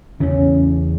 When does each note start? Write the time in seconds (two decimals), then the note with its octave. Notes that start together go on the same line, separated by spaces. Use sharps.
0.20 E2 C#3 E3 C#4